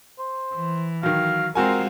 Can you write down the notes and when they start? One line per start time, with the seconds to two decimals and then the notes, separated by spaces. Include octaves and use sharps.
0.19 C5
0.55 E3
1.03 D#3 F#3 F5
1.55 G#3 C4 F4 F#4 A#4 G#5